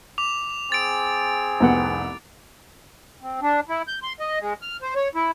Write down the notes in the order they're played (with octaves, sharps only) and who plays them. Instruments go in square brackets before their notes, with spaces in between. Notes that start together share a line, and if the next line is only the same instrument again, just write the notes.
[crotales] D6 F7
[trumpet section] C4 G#4 [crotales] A6 D7
[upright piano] F1 C2 F#5 [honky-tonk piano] B3
[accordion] C4
D4
E4
G6
C6
D#5
G#3
F6
C5
C#5
E4